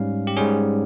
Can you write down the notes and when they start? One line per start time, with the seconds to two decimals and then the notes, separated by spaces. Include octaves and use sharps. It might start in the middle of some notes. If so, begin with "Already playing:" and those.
Already playing: G#2 G3 C#4 F5
0.27 G4
0.37 G#2 G3 C#4 G#4